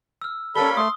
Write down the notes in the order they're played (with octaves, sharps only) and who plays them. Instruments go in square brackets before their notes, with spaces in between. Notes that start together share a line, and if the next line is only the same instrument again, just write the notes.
[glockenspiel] E6 F6
[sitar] G3 A#3 C#4 [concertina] A4 [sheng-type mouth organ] B5 [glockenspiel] G7
[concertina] A3 [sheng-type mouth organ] C6 [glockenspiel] D#6